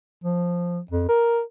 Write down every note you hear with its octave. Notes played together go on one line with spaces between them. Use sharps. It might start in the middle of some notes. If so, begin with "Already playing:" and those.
F3
F2
A#4